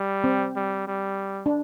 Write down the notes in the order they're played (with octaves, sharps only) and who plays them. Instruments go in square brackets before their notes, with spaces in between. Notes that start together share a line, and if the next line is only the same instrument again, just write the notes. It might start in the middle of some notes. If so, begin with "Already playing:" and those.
Already playing: [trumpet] G3
[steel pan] C4
[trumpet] G3
G3
[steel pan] D4